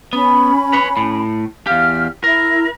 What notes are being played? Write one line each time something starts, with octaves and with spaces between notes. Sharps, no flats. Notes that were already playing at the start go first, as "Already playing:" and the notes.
B3 C#4 B5
B4 C#5
A2
E2 G4 F5 F6
E4 A#4